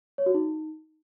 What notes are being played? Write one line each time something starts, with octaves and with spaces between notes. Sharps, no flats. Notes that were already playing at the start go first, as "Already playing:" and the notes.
C#5
F#4
D#4